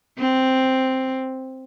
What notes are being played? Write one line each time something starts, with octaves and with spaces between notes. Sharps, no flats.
C4